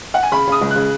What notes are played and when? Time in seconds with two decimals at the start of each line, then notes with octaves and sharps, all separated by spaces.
0.14 F#5
0.23 G#5
0.32 C#3 B5
0.47 C#3 D#6
0.61 C#2
0.71 F#6
0.76 C#3